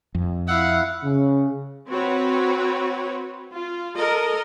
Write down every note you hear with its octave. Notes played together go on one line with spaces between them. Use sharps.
F2
E4 F5 F#5 E6
C#3
C4 F#4 B4 C#5
F4
A4 A#4 D#5